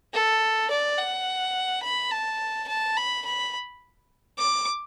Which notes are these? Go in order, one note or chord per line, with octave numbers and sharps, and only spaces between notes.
A4
D5
F#5
B5
A5
A5
B5
B5
D6